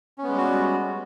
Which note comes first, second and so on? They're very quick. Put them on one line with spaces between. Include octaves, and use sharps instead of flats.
C#4 B3 G#3 G3 F#4